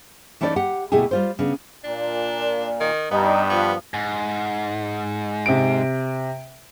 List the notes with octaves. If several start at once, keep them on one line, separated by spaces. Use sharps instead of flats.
E3 A3 C#4 D#4 A4 D5
G4 F#5
D2 B2 A3 E4 G4 G#4
G3 F4 C5
C#3 B3 D4
A#2 D4
D#3
G2 G3 B3 D#4
F3 B3
G#2
C3 D7